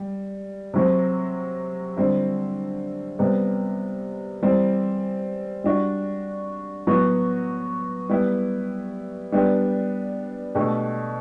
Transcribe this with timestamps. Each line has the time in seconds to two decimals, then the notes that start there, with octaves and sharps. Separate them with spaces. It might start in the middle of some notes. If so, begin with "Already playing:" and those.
Already playing: G3
0.74 C3 F#3 C4
1.97 D3 G3 C4 E4
3.19 C3 G3 B3
4.42 E3 G3 C4 G4
5.64 G3 D4 F#4
6.87 A2 F#3 B3 F#4
8.09 G3 B3 E4 G4
9.32 G3 B3 D4 G4
10.55 B2 A3 D4 G4